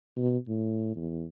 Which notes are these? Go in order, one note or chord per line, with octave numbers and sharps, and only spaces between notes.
B2
A2
E2